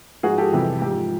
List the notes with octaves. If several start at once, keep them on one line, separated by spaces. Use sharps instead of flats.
G#2 F3 F#4 G#4
G4 A4
F2 C3 E3 G3
G#2 F3 G4